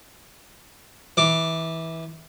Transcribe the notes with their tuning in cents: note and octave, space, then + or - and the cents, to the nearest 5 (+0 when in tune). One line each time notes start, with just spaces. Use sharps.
E3 -20 D6 +0